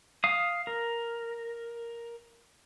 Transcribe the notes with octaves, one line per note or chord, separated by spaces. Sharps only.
F5 D#6
A#4